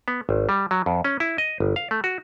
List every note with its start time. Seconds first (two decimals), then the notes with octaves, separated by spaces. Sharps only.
0.08 B3
0.29 G#1
0.49 G3
0.71 F#3
0.86 F2
1.04 C#4
1.20 E4
1.38 D#5
1.60 G1
1.76 F5
1.91 A3
2.04 F#4